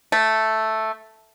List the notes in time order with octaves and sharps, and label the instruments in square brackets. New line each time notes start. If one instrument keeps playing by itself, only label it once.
[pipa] A3